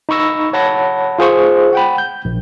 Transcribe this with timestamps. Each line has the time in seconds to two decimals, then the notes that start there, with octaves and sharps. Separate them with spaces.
0.09 D#4 B5 C#6 E6 A#6
0.53 C#5 F#5 A5 B5 A#6
1.19 F4 G#4 C5 C#6
1.73 F#5 G5 B5
1.98 G6
2.25 A#1